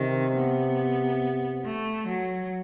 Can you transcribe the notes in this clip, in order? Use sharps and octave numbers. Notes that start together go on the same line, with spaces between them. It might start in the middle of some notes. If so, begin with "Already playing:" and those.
Already playing: C3 D#3
B3
A3
F#3